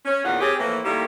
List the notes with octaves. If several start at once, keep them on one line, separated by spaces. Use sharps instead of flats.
C#4
E2 A#2 D#3 F4 F#5
C4 C#4 G4 G#4
A2 E3 F3 A#3
D#3 G3 A3 A#3 E4